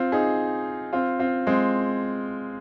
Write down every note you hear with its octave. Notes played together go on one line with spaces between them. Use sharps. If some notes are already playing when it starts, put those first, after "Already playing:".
Already playing: C4 F4
D#4 G#4
C4 F4
C4 F4
G#3 C4